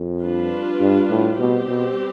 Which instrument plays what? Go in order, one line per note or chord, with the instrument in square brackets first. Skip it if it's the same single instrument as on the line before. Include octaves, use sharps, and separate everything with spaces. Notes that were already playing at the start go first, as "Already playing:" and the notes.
Already playing: [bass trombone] F2
[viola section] G3 D4 F4 B4
[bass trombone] G2
A2
[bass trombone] B2 [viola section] G3 C4 G4
[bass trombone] B2